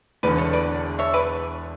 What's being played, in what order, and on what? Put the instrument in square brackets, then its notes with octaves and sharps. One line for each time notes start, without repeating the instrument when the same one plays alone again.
[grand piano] E1 E2 D3 [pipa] B4 D5
[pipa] A4 C#5
B4 D5
C#5 E5
B4 D5